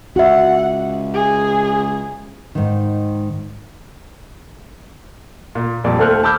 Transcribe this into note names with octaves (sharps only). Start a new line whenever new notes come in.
C#2 F#4 E5 F#5
G#4
G#2 D#3
A#2
F2 A#2 G3 D5
D#2 A3 A4 C5 F6 F#6
A5 B5 D6 E6 F6 G6